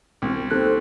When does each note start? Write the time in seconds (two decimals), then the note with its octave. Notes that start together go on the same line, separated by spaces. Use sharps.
0.22 E1 C2
0.51 D#2 C4 A4 F#6